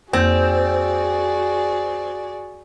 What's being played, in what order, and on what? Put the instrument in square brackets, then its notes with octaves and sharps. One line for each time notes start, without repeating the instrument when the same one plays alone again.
[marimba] F2 A#3 [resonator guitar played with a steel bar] C4 [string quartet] F#4 G#4 D5